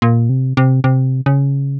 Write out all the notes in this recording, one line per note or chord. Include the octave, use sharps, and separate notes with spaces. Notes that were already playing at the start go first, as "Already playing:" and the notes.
A#2
C3
C3
C3
C#3